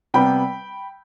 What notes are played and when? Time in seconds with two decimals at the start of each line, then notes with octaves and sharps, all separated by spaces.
0.14 C3 G3 B3 G5 B5